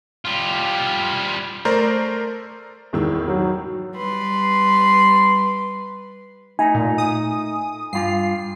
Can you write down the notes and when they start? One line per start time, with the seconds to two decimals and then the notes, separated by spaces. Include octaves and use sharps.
0.25 G3 F4
1.65 A3 A#4 C5 D5 A#5
2.93 G#1 E2 D#3 E6
3.28 F#3 F#4
3.95 G3 B4 C6
6.59 A3 D#4 G#5
6.75 A#2
6.98 D#6
7.93 G2 F4 C7